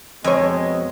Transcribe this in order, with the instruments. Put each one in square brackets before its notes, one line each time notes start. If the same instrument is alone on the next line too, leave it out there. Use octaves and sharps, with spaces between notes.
[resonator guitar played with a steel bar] F2 [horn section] B2 G#3 [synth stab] C#5 G#5